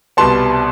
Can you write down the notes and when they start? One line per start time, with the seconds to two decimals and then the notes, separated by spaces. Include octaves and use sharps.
0.17 C2 B2 G3 B3 A5 C6